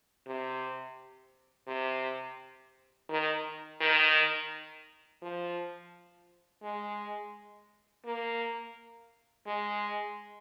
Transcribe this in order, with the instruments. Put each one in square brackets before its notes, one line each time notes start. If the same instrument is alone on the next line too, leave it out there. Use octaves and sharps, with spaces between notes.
[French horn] C3
C3
D#3
D#3
F3
G#3
A#3
G#3